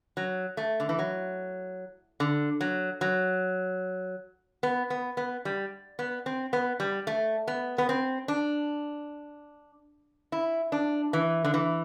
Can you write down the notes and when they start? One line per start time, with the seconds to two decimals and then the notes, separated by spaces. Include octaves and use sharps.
0.17 F#3
0.57 A3
0.80 D3
0.89 E3
0.99 F#3
2.20 D3
2.61 F#3
3.01 F#3
4.63 B3
4.90 B3
5.17 B3
5.45 G3
5.99 B3
6.26 C4
6.53 B3
6.80 G3
7.07 A3
7.48 B3
7.78 B3
7.89 C4
8.28 D4
10.32 E4
10.72 D4
11.13 E3
11.44 D3
11.54 E3